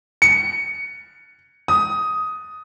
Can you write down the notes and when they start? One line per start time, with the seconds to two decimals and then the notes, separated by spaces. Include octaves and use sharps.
0.22 C#7
1.68 D#6